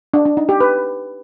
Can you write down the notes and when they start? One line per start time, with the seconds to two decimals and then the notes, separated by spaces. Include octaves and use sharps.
0.14 D4
0.25 D4
0.37 D#4
0.49 G4
0.61 B4